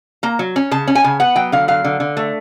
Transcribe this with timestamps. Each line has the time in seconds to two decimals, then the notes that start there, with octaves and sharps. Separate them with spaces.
0.23 A#3 A#5
0.39 F#3
0.56 C#4
0.71 C#3 A5
0.88 C#4
0.95 G#5
1.04 C#3
1.20 B3 F#5
1.36 F#3 G5
1.52 D3 F5
1.68 F#3 F5
1.84 D3
2.00 D3
2.17 A3